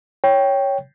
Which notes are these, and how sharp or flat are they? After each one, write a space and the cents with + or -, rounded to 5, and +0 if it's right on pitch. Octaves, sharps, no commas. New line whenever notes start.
C#5 +0 G5 +0